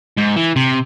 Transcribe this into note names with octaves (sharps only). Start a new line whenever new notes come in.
G#2
E3
C3